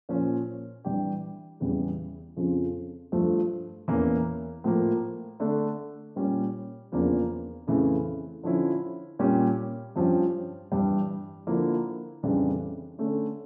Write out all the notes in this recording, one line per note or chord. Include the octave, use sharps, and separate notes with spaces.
A#2 F3 C#4
E3 G3 D4 G4
E2 C#3 E3 G3
F2 C#3 F3
G2 F3 A3
E2 E3 A#3 C#4
A2 F3 A#3
D3 A3 D4
A#2 G3 C#4
E2 C#3 F3 A#3 D4
F2 C#3 E3 A3 E4
D3 F3 C#4 E4
A#2 G3 C#4 G4
G2 F3 C#4 G4
G2 E3 G3
D3 F3 A#3 E4
F2 C#3 E3 G3 D4
D3 A3 C#4